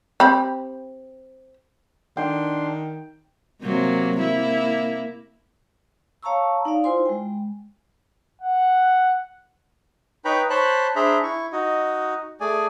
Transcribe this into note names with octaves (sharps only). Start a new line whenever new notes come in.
C4 G4 B5
D#3 D4 G5 C6
C3 F#3 A#3
A#3 E4
C#5 F5 A5 A#5 C#6 E6
D#4 D5 F5
E4 F4 C5 G#5 C6
G#3 G5
F#5
D#4 B4 C#5 G5 A#5 B5
C5 C#5 A5 B5 F#6
D4 G#4 C5 E5 A#5 B5
E4 C#6
D#4 F#4 D#5
A3 G#4 D5 G#5